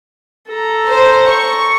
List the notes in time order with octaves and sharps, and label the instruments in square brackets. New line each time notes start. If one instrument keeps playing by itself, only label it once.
[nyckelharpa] A4 A#5
[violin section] C5
C#6